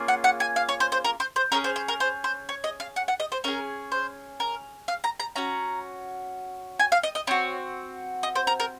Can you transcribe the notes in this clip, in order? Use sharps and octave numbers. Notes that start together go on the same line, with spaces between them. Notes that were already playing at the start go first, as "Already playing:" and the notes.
Already playing: A#3 C#4 F4 G#4
F#5
F#5
G#5
F5
C#5
C5
C5
A#4
C5
C5
C#4 G#4 A#4
C5
C5
A#4
C5
C5
C#5
D#5
F5
F#5
F#5
D#5
C5
C#4 G#4 A#4
C5
A#4
F5
A#5
A#5
C#4 F#4 A#5
G#5
F5
D#5
D#5
C4 F#4 C#5
D#5
C5
A#4
A#4